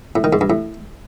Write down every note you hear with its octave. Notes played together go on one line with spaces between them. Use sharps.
A2
D#3
G#2
G2
A2